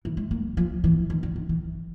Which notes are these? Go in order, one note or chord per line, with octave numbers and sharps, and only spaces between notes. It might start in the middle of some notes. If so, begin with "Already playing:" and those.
E3
G#3
A#3
F3
E3
D#3
D3
D#3
E3